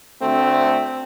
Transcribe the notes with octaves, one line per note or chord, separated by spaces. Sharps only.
D2 A3 C4